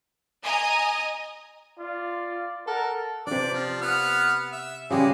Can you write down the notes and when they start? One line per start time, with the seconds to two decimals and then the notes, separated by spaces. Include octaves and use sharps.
0.43 D#5 G#5 A#5 D#6
1.79 F4 D5
2.67 A4 A#4 F#5
3.27 C3 D4 D5
3.54 F3
3.82 B3 F#5 F6
4.52 E5
4.91 C#3 G3 G#3 G#4